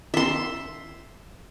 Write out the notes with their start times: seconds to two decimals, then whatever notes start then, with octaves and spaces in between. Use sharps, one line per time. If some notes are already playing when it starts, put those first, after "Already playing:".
0.14 E5 C6